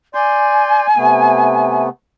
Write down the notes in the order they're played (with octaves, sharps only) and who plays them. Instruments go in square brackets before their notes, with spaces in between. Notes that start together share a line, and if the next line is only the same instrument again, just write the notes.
[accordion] D5 C6 G6 [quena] G#5
[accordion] C3 A3 B3